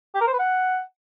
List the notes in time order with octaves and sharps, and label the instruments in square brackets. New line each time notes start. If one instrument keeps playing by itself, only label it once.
[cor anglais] G4
A#4
C5
B4
F#5